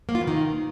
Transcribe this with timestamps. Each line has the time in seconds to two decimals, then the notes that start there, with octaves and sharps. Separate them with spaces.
0.09 A#3
0.15 F4
0.21 E3
0.27 D#3